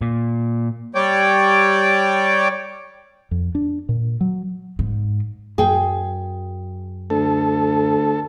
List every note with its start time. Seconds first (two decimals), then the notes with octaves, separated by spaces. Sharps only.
0.01 A#2
0.95 G3 C#5 D5 G5
3.31 F2
3.55 D4
3.89 A#2
4.21 F#3
4.79 G#2
5.58 F#2 F#3 G#4 G5
7.10 D2 A4